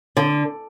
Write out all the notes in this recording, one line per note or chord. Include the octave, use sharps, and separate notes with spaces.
D3